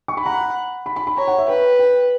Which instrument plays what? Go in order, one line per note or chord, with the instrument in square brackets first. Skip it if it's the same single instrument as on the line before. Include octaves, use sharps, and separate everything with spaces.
[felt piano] C#6
B5
[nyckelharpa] F#5 [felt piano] A#5
[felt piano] B5
B5
B5
B5
[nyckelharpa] C#5 [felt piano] A#5
[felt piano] F#5
E5
[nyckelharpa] B4 [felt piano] G5
[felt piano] G5